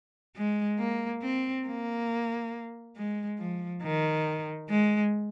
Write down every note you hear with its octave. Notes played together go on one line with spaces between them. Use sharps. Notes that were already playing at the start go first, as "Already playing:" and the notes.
G#3
A#3
C4
A#3
G#3
F3
D#3
G#3